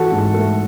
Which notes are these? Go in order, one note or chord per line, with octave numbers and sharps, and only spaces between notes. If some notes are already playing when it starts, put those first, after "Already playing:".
Already playing: E3 F#4 A4
G#2
A3